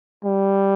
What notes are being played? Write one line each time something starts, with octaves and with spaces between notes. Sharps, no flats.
G3